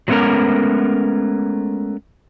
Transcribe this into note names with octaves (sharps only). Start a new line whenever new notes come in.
F#3 G#3 A3 B3 C#4 A#4